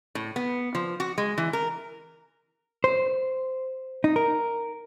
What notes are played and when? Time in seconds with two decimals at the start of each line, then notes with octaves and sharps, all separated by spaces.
0.15 A2
0.36 B3
0.75 F3
1.00 F#4
1.18 G#3
1.38 E3
1.53 A#4
2.84 C5
4.04 D#4
4.16 A#4